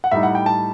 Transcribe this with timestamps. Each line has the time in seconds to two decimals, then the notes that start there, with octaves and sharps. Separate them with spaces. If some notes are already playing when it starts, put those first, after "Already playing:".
0.04 F#5
0.11 A2 G3 D#4 E5
0.23 F#5
0.35 G5
0.46 A5